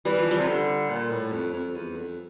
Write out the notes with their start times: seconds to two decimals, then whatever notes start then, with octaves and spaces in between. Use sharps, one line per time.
0.05 E3 G3
0.18 F3
0.31 G3
0.39 C3
0.48 D3
0.89 A#2
1.11 A2
1.32 F2
1.53 F2
1.75 E2
1.96 F2